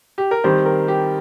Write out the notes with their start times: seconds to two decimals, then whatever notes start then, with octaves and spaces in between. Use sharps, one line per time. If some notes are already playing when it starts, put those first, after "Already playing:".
0.18 G4
0.31 A#4
0.44 D#3 G3 C4 G4 C5
0.66 A#4
0.88 G4